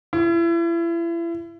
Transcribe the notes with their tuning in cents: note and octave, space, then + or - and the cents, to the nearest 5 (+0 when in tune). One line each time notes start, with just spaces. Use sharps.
E4 +35